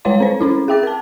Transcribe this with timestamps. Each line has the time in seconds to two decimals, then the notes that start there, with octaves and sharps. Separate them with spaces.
0.05 G3 G#3 B4 C#5 F5 C6
0.20 C4 C5
0.41 C4 C#4 E4
0.68 G#4 E5 G5 D6 A6
0.83 A#4 A5